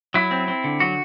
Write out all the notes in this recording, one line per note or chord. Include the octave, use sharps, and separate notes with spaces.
F#3 E4
C4
C4
D3
F#3 F#4